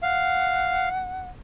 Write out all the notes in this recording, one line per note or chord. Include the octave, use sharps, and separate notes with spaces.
F5 F#5